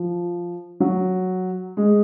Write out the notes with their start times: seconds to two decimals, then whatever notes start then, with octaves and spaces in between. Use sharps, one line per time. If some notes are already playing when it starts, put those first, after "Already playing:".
Already playing: F3
0.80 F#3
1.77 G#3